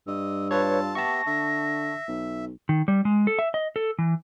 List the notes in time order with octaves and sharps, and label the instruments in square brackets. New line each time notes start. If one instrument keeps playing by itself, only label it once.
[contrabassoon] G2 [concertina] D#5 [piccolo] E6
[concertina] F4 A5 [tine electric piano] B4 C#5
[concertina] B3 G4 E5 [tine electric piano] A5 C#6 [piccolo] A#6
[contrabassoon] D3 [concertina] E5
[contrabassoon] B1
[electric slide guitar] D#3
G3
G#3
A4
E5
D#5
A4
E3